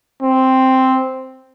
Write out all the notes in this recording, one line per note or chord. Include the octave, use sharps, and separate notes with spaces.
C4